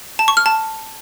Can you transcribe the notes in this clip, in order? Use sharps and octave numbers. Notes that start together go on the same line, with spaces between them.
A5
C#6
F6
A5